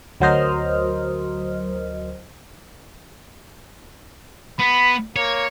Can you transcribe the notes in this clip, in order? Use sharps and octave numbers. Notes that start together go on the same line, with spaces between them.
D2 F#3 A#4 C5 D#5 F6
B3 B5
A#3 C#5